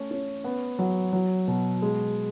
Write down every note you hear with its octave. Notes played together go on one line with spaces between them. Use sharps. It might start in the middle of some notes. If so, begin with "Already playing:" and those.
Already playing: A3 C#4
C#4
B3
F#3
F#3
B2
G#3